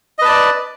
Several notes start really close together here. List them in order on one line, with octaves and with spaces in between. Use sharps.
D#5 B4 A5 D5